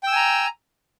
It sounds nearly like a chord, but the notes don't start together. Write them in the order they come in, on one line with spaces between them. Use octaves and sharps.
G5 E6 G#5 A#5